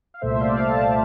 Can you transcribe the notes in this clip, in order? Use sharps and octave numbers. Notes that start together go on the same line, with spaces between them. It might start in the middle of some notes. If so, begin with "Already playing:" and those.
F5
C2 A#2 A3 C5 E5
D5 F5
F5 A5